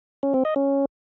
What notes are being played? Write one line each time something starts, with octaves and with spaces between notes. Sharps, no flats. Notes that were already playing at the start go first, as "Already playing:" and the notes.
C#4
C4
D#5
C#4